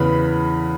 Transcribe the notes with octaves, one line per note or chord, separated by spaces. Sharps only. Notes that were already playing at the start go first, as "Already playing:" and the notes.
Already playing: E2 C#3 E3 B5